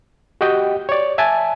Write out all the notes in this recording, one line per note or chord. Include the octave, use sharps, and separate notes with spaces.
F#4 G4 D#5 G5
C#5 D5
E5 G#5 A5